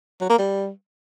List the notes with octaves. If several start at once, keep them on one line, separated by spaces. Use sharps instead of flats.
F#3
A#3
G3